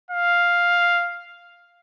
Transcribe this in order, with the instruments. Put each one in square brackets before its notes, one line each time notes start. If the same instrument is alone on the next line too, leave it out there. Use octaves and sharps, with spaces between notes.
[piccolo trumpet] F5